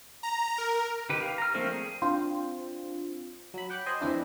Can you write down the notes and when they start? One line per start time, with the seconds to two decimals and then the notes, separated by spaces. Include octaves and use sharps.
0.23 A#5
0.58 A#4
1.10 D#3 G4 B4
1.22 F5
1.38 A#5 F6
1.54 F3 A3 A#3 C4 D4
1.71 G#4
2.02 C4 D4 F4 C5
3.54 F#3 B5
3.70 F#5 G5 D6 F#6
3.86 C5 D#5 G#5 B5
4.01 F2 E3 C4 D4 E4